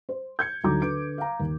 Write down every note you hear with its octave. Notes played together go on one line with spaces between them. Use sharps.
C5
G6 G#6 C#7
D2 F#3 D#4 F#4 A#5 D6
D3 B4 D7
F5 A#5
D#2